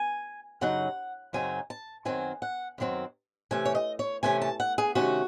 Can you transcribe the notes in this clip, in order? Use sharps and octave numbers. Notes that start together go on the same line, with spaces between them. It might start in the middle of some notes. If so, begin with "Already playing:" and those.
Already playing: G#5
F#2 C#3 F#3 D#4 F#5
F#2 C#3 F#3 C4 D#4 G#5
A5
F#2 D#3 F#3 C4 G#5
F#5
F#2 D#3 F#3 C4
C3 E3 A3 C#4 G#5
C#5
D#5
C#5
C3 E3 A3 C#4 G#5
A5
F#5
G#4
C3 D#3 A3 C#4 F#4